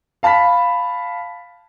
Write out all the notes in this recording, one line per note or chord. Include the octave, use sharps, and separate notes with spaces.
F5 A5 B5 B6